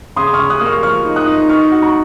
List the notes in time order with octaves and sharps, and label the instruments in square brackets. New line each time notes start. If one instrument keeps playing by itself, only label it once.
[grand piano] C#3 [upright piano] C6 D#6
[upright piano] C#6 F6
[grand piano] C#3
[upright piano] D#6 F#6
[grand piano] A#3
[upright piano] C#6 F6
[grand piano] F3 [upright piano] C#6 F6
[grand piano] D#4
[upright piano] D#6 F#6
[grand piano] D#4
[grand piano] D#4 [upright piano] C#6 F6
[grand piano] F#4
[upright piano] A#5 C#6